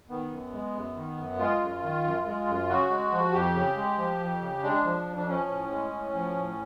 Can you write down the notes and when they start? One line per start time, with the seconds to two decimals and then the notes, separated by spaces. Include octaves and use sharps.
0.10 D#3 B3
0.31 F#2
0.53 G#3
0.74 F#2
0.96 D#3
1.18 F#2
1.39 G#3 F4
1.61 F#2
1.83 D#3
2.04 F#2
2.26 G#3
2.47 F#2
2.69 C#3 F#4
2.90 G#3
3.12 F3
3.33 F2 G4
3.55 C#3
3.77 G#3
3.98 F3
4.20 F2
4.41 C#3
4.63 G#3 D4
4.85 F3
5.06 F2
5.16 D4
5.27 F3 C#4
5.49 A2
5.71 G#3
5.92 A2
6.14 F3
6.36 A2